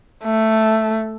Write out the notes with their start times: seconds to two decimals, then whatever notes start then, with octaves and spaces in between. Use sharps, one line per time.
0.24 A3